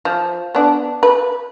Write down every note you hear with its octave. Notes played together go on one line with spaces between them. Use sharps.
F3
B3 D4
B4